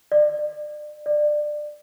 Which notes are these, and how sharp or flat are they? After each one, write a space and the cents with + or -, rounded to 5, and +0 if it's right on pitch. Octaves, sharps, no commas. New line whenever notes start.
D5 +30
D5 +20